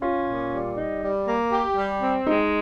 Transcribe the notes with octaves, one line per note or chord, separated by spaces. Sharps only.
C#4 F4
A#2
G3
D#4
G3
A#3
G4
G3
C4
G#3 D#4